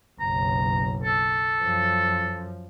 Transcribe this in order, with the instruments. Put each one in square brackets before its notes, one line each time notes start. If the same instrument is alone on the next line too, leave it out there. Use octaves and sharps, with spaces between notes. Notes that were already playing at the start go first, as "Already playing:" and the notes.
[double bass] F#1 B1 [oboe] A#5
[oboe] A4
[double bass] F#2 F3